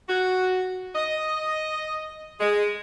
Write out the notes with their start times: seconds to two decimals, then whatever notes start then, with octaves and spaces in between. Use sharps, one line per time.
0.09 F#4
0.95 D#5
2.40 G#3